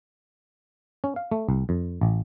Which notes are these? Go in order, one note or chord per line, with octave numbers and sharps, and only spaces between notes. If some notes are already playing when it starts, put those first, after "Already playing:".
C#4
F5
A3
C2
F2
A1